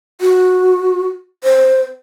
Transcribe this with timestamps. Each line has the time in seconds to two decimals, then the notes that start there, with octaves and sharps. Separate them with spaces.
0.21 F#4
1.44 C5